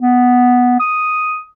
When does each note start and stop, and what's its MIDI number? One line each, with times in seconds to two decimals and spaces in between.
0.01 0.76 59
0.80 1.43 87